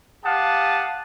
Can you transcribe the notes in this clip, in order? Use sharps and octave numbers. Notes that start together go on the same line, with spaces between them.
G4 F5 F#5 A5 D#6